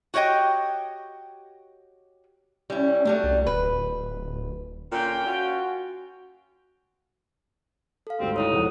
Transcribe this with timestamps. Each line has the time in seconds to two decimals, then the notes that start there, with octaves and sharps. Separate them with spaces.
0.14 F#4 G4 C#5 D#5 G5
2.70 G3 C#4 E4
3.05 F#3 G3 A3 D4
3.24 C2
3.47 D1 B4
4.92 A#2 D3 C#4 G5
5.26 C#4 F4 F#4
8.07 A4 F5
8.20 G#1 D2 G3 C4
8.36 D#4 E4 A4 C#5
8.52 E1 F2 F#5